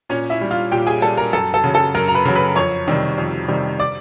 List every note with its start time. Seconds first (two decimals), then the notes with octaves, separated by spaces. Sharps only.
0.09 A#2 C#4 C#5
0.30 E4 E5
0.41 G3
0.51 F4 F5
0.72 A#2 G4 G5
0.87 G#4 G#5
1.02 G3 A4 A5
1.18 A#4 A#5
1.33 F#2 A4 A5
1.54 A4 A5
1.64 C#3 F#3
1.74 A4 A5
1.95 F#2 A#4 A#5
2.08 A#5
2.15 B4 B5
2.25 C#3 F#3
2.35 B4 B5
2.56 F2 C#5 C#6
2.87 C3 D#3 G3
3.18 F2
3.48 C3 D#3 G3
3.80 D5 D6